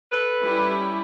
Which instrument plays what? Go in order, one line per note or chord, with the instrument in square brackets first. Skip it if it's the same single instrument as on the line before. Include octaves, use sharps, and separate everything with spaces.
[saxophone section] A4 B4
[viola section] G3 C#4 E4